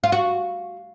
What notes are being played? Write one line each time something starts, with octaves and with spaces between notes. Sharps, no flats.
F4
F#4